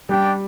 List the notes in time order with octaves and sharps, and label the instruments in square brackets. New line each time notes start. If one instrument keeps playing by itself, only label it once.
[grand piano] G3 [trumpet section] D4 G4 D5 G5